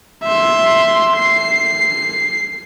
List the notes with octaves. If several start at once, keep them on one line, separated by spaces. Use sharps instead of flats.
E5 C6
C7